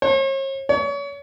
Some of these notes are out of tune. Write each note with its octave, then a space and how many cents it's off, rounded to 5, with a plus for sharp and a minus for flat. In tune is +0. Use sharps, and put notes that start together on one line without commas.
C#5 -45
C#5 +35